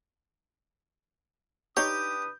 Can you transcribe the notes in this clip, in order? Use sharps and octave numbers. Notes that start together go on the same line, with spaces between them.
D4 D#4 G4 B4 C#5 D#6 G6